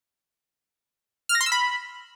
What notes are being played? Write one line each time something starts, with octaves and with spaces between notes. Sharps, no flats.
F6
A#6
C6
E6
B5